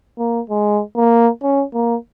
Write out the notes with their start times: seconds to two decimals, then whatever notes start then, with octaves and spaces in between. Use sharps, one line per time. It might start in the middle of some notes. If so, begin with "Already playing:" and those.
0.18 A#3
0.50 G#3
0.96 A#3
1.42 C#4
1.74 A#3